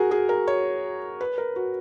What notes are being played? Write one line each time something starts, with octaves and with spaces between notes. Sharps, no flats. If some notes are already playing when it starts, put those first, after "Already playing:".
Already playing: F#4 G#4 A#4
G#4
A#4
C#5
B4
A#4
F#4